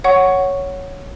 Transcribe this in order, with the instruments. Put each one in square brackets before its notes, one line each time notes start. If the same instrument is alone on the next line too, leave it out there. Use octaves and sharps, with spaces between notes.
[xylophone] C#5 F#5 C#6